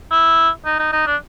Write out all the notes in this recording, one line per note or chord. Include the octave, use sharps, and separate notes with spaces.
E4
D#4
D#4
D#4
D4